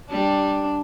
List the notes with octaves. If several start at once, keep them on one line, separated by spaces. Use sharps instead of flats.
G3 D4